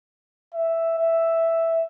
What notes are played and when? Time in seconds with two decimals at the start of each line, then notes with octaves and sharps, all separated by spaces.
0.54 E5
0.99 E5